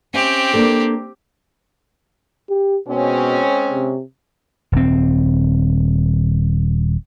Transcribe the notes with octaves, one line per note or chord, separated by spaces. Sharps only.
C4 C#4 G4 E5
A#3 D4 A4
G4
B2 G#3 C4 C#4
C3
D#1 C4